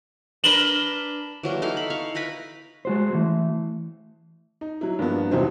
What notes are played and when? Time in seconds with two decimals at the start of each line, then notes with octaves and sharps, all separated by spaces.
0.44 D4 A#4 B4 E7 F#7 G7
1.43 E3 F#3 G3 A#3
1.62 D#4 E4 A4 F5
1.77 B5
1.90 F5 C#6
2.15 E4 A#4 B4 B5
2.85 G#3 F#4 C5
3.13 E3 A3
4.61 D#4
4.81 F#3 E4
4.99 G2 F3 A#3 B3
5.31 E1 C3 F#3 D#4 E4 C5